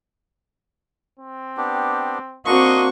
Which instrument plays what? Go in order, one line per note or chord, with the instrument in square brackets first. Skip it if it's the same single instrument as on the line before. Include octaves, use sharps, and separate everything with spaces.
[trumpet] C4
[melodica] B3 D4 G4
[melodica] A#3 D4 C6 [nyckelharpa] C4 C#6 [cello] F#4 [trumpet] D#5